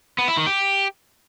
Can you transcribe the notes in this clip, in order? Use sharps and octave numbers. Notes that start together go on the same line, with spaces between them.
B3
E4
D#3
G4